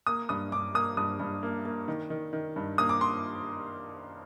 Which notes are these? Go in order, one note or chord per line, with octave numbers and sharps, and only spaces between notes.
A#3 D#6
G2 D#6
G2 D6
A#3 D#6
G2 D#6
G2
A#3
A#3
D#3
D#3
D#3
G2
A#3 D#6
D6
C6